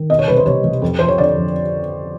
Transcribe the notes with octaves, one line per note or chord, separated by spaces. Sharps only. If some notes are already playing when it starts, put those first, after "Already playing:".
Already playing: D#3
B2 D#5
C#5
C2 B4
C5
C2 C#5
C2
F2
F3 C5
C#5
D3 D5
F2